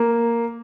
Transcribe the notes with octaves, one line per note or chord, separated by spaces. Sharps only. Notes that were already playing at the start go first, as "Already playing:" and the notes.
Already playing: A#3